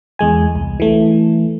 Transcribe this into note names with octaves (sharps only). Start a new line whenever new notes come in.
E2 G#3 G#5
C2
E3 A3